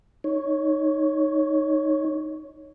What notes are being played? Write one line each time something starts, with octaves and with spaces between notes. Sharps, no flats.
D#4 C#5